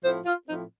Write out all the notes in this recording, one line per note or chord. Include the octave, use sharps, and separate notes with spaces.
A2 F3 C4 C5
F4
A2 F3 C4 D#4